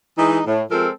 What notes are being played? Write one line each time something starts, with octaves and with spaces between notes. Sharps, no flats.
E3 G#3 D#4
A2
F3 G#3 C4 A4 A#4